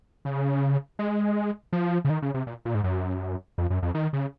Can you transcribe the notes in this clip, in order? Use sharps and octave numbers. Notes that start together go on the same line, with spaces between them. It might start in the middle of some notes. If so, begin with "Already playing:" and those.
C#3
G#3
F3
C#3
D#3
C#3
C3
A#2
A#2
G#2
F#2
F2
F#2
F2
D#3
C#3